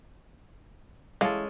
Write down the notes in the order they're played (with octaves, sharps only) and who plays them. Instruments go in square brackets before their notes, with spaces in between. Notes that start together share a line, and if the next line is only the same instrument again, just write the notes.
[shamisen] E3 F5 [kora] G#3 C#4 A4